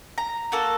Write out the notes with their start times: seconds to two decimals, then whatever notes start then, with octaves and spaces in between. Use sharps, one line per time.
0.18 A#5
0.52 A#3 F#4 A4